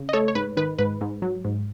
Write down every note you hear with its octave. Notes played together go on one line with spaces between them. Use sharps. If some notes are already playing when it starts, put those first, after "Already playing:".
Already playing: C#3
D#5
A3 A4 C#5
C#5
G#2 B4
D#3 B4
G#2 B4
G#2
F#3
G#2